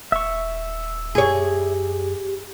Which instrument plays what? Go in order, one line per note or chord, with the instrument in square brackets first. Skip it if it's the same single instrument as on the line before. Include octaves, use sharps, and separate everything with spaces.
[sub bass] D#1 [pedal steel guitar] E5 C#6
[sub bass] F#2 [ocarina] G4 [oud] G#4 C#5